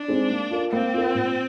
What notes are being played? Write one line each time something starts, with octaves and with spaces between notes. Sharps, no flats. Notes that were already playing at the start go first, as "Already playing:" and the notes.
Already playing: D4
G#3 C4 D#4
A#3
F4 A#4
A#3 C4
F4 A#4
A#2